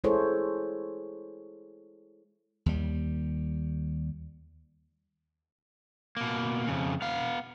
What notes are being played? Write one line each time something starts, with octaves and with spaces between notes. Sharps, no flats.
G#3 E4 G#4 A4 C5 C#5
D#2 G3
B2 A#3
F2 C#3
B3 F5